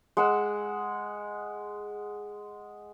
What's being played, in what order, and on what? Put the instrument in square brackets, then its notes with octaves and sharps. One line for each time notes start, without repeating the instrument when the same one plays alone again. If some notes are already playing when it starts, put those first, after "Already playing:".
[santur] G#3 F#5 E6